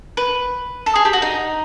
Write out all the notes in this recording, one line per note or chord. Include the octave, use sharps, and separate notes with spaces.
B4
A4
G#4
G4
F#4
D#4